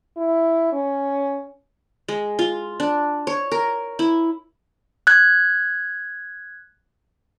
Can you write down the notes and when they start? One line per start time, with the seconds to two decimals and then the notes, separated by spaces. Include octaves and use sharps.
0.17 E4
0.72 C#4
2.08 G#3
2.39 F4
2.80 D4
3.27 C#5
3.52 A#4
3.99 E4
5.07 F#6 G#6